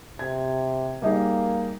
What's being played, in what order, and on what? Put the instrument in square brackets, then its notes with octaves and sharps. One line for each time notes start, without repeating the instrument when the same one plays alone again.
[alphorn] C3 [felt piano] G#6
[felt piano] G3 D#4 G#4 [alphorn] A#3